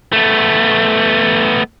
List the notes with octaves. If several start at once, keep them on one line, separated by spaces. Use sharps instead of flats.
A3 B3